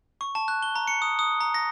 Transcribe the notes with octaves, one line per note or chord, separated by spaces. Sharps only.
C#6
A5
F#6
G7
A#5
C#7
D#6
D#6
A#5
A#6